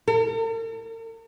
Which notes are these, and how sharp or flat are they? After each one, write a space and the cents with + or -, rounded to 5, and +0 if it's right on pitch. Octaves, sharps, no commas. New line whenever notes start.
A#4 -45